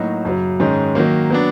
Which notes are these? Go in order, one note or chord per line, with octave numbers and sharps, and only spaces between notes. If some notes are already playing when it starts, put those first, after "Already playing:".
Already playing: A2 F#3 A#3 D#4 F#4
F#2 C#3 F#3
G#2 D#3 G#3 C#4
D#3 F#3 A#3
F#3 B3 D4